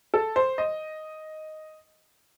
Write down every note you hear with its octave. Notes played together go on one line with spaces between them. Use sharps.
A4
C5
D#5